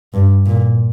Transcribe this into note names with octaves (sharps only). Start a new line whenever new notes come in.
G2
A#2